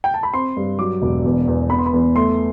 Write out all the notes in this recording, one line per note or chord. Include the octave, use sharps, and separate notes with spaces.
G5
A5
B5
C4 C6
G2
F#3 D6
E1
E2
E2
B3 B5
C6
B5
E2
A3 C6